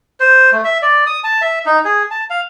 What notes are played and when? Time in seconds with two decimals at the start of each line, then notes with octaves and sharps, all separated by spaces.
0.20 C5
0.52 A3
0.65 E5
0.82 D5
1.06 D#6
1.24 A5
1.41 E5
1.66 D#4
1.85 G#4
2.11 A5
2.30 F5